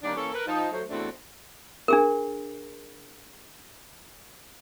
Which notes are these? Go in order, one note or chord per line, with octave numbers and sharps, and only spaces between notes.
D#3 G3 A#3 C#4 D4
E3 A#3 C#4 A4
A#4 B4
F3 D#4
F#3 A3 C5
E2 A2 A3 C4 D4 F#4
D4 G#4 A#4